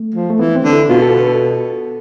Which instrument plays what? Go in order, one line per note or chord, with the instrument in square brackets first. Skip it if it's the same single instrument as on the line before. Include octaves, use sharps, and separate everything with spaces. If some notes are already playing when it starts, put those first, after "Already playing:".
Already playing: [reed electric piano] A3
[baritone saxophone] F3
[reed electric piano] A3
[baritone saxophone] E3 [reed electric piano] B3
[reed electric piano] C4
[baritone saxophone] D3
[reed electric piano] E4
[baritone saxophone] B2 [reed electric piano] F4
[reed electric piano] A4
B4
A4